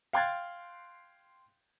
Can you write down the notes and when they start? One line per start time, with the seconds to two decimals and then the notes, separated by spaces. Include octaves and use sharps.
0.13 F5 G5 C6 F#6 G#6 A6